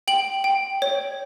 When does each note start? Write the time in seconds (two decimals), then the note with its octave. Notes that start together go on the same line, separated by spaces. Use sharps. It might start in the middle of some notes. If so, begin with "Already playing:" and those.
0.08 G5 F#7
0.44 G5
0.82 C#5